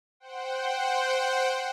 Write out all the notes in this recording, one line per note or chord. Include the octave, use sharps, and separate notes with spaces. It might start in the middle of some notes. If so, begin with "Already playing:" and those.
C5 F#5 G5